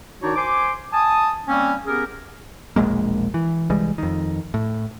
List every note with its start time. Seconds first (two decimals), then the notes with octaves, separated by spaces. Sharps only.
0.22 D#3 D4 D#4 F#4 C#5 D5
0.36 C5 G#5 C6 D6
0.92 G#5 A5 D#6
1.48 G3 A#3 C4 C#4
1.87 B3 C#4 G4 G#4 A#4
2.76 E1 A#1 G#3 A#3
3.34 E3
3.69 C2 E3 G3 G#3
3.98 F2 D#3
4.54 A2